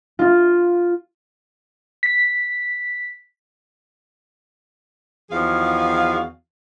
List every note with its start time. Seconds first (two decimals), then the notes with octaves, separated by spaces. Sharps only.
0.19 F4
2.03 B6
5.31 E2 D#3 F3 F#4 G#4 F5